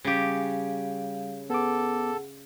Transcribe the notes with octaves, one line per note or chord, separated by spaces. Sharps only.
C#3 G3 G4 F5
B3 G#4 A4 F#5 D6